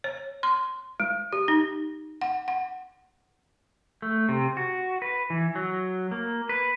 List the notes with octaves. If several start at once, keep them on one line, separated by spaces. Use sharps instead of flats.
C#5
C6
G#3
G4
D#4
F#5
F#5
A3
C3
F#4
B4
E3
F#3
A#3
B4